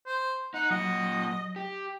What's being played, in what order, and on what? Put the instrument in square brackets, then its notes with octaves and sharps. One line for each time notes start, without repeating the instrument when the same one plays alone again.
[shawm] C5
[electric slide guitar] D#4 [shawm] F#5
[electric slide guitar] A#2 F#5 [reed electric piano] F#3 [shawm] D#5
[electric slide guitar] G4